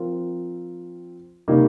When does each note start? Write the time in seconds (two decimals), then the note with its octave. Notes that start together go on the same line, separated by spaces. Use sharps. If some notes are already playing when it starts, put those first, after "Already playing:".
Already playing: F3 C4 F4 A#4
1.48 C3 D#3 G3 A#3 D#4